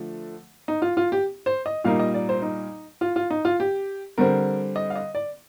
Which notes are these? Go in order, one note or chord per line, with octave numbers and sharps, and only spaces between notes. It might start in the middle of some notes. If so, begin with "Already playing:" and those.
Already playing: D3 F3 A3
D#4
F4
F4
G4
C5
D#5
A#2 G3 A#3 D#4 F5
D#5
D5
C5
D#4
F4
F4
D#4
F4
G4
D3 G3 C4 A#4
D#5
F5
D#5
D5